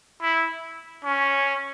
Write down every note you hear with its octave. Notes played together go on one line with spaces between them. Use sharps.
E4
C#4